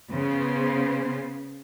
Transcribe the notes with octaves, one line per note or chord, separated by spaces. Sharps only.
C#3 B3 C5